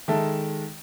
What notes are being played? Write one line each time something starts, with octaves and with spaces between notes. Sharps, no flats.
D#3 G#3 A4 E5 A5